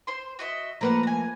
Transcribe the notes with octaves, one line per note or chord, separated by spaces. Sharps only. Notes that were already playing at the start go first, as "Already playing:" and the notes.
C5 C6
F#4 D#5 E5
F3 A3 A#3 A#4 B4 F#5
G#5 A#5